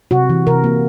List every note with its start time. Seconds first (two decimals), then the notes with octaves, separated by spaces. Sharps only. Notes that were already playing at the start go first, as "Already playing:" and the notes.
0.11 C3 F#4
0.30 E3
0.47 C3 A#4
0.64 A#3